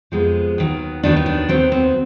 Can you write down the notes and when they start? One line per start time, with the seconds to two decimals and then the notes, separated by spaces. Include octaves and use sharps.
0.12 F2 C3 F3 G#3 B3
0.58 D#2 D#3 F#3 B3
1.03 D#2 D#3 F#3 B3 D4
1.17 D#4
1.26 D4
1.48 D#2 D#3 F#3 B3 C4
1.72 C4